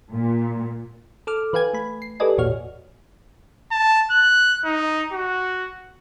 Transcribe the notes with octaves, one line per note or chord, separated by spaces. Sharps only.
A#2
A4 D6 F6
E3 B4 F5 G5 G#5 G#6
A3 B5
C7
G4 A4 B4 D5 D#5 G#5
A1 E2 A#2 F#4 C#5 F6
A5
F#6
D#4
F#4